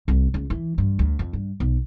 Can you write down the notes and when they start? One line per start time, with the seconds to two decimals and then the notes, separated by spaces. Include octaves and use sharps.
0.08 C2
0.34 C#2
0.50 E3
0.78 G2
0.99 D2
1.19 F2
1.33 G2
1.60 B1